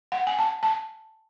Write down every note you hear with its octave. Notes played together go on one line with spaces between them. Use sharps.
F#5
G#5
A5
A5